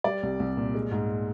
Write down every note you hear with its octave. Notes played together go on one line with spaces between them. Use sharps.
G3 D5
C2
C2
A#2
G#3
G#2